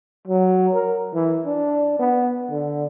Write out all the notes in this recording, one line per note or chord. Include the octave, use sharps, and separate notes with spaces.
F#3
A#4
E3
D4
B3
D3